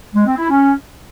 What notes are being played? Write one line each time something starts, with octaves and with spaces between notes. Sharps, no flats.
G#3
C4
E4
C#4